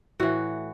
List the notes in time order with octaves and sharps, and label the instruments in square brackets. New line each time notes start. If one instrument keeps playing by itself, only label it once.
[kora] A2 E3 F#4